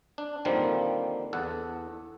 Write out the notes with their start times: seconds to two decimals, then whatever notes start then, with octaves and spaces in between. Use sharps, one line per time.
0.18 D4
0.45 D3 D#3 F3 G3 A#3 C4
1.33 E2 A4 F#5